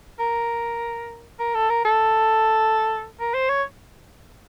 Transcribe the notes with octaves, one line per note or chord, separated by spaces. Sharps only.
A#4
A#4
A4
A#4
A4
A#4
C5
C#5